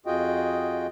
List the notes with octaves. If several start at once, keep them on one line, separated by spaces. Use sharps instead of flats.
F2 F4 F#4 G#4 D#5 G5